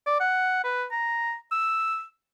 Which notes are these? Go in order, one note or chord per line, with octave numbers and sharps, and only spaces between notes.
D5
F#5
B4
A#5
E6